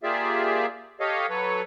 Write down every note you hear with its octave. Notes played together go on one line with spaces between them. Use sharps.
A#3 F4 G4 G#4 D5 E5
G4 A4 C#5 D#5 F5
F#3 A4 B4 C#5